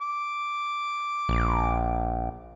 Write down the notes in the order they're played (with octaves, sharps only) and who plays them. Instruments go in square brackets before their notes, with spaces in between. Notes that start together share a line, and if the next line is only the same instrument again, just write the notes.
[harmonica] D6
[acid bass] A#1